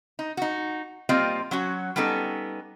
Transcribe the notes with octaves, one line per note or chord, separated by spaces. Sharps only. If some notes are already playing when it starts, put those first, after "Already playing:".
D#4
D#4 F#4
G3 A#3 C4 F4 D#5
F#3 C#4 F#4
G3 B3 C#4 D#4 A4